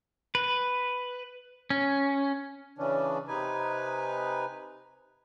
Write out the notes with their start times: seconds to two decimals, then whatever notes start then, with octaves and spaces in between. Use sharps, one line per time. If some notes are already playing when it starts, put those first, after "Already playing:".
0.35 B4
1.70 C#4
2.78 C#3 E3 C#4 D4
3.28 C3 D#4 B4 G#5